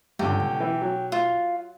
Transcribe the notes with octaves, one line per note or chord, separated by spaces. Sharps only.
C#2 G2 D3 E3 G4
B1
E3
F#3
F4